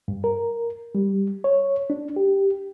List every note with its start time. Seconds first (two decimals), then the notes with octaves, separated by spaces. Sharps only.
0.08 G2
0.24 A#4
0.95 G3
1.44 C#5
1.90 D4
2.16 G4